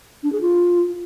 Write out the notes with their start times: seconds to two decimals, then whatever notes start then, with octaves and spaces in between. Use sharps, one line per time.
0.23 D4
0.32 G#4
0.41 F4